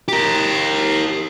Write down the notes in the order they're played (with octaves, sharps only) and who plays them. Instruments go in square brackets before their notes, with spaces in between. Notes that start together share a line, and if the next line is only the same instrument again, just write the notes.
[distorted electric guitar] G4 A#4